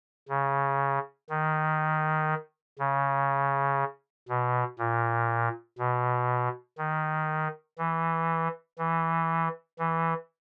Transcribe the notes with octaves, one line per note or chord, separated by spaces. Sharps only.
C#3
D#3
C#3
B2
A#2
B2
D#3
E3
E3
E3